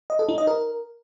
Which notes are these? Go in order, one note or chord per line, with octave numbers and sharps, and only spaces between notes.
D#5
A4
D#4
D#5
A#4